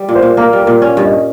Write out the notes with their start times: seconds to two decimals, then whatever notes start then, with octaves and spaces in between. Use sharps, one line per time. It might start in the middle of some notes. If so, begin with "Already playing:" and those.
Already playing: G3
0.09 A#2
0.15 C5
0.22 A#2
0.37 A#3 A#4
0.53 G3
0.60 A#4
0.67 A#2
0.82 C#4 C#5
0.97 G2
1.05 D#5